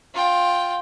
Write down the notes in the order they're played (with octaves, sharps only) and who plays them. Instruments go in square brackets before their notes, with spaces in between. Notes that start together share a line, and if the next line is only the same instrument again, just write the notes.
[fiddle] F4 G5